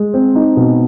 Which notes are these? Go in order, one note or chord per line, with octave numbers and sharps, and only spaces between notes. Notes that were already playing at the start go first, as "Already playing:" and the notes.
Already playing: G#3
C4
D#4
B2